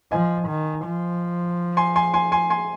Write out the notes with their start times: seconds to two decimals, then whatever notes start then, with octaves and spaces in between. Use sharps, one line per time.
0.12 F3 D#5 G#5
0.48 D#3
0.85 F3
1.77 G#5 C6
1.96 G#5 C6
2.14 G#5 C6
2.32 G#5 C6
2.50 G#5 C6